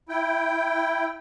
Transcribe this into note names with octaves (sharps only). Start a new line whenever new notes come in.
E4 G5